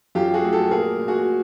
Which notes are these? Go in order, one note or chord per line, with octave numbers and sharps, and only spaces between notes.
F#2 F4 G4
F#4 G#4
A3
G4 A4
A#2 G#4 A#4
A#2
F#4 G#4